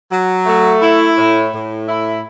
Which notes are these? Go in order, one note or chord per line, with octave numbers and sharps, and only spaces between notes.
F#3
A3
E4
A2
A2
E4